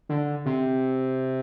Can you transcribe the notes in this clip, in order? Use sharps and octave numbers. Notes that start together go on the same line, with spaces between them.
D3
C3